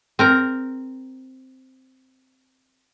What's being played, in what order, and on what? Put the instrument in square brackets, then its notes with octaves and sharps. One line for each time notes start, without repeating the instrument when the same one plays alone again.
[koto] C4 A#4 A#5